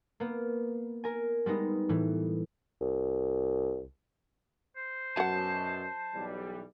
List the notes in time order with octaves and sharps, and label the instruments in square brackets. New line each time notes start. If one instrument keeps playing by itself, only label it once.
[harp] A#3 B3
A#4 G#5
G3 G#3 B3 D#4
A2 E3
[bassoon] C2
[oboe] C5
[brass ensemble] F#2 B2 [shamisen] F#3 F#5 [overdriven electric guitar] A5
[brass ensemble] B1 E3 G3